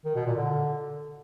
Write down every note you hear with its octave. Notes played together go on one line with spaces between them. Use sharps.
D#3
B2
A#2
D3